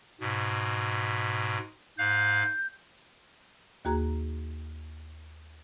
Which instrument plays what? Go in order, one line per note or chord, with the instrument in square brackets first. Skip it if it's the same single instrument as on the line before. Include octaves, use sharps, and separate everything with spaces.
[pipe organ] G#2 B2
[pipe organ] G#2 F5 F#6 [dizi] G6
[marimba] D#2 A#3 F#4 G#4 A#5